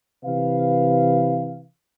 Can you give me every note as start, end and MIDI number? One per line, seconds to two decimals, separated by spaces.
0.24 1.63 48
0.24 1.63 52
0.24 1.63 71
0.24 1.63 77